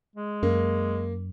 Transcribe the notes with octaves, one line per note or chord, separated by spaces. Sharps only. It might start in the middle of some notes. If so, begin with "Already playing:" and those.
G#3
F#2 A#3